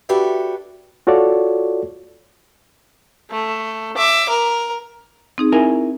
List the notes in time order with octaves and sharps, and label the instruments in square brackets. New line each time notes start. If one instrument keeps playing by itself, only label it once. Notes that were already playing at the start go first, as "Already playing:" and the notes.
[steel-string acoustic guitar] D4 F#4 G4 A4 B4 E5
[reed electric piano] F4 F#4 A4 C#5 D5
[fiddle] A3
E5 D6
A#4
[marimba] C4 D#4 G#4
[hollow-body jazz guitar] E4 A#4 G#5